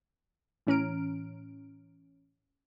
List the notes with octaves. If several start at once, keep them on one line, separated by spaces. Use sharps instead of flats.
A2 E3 C#4 A#5 F6 D7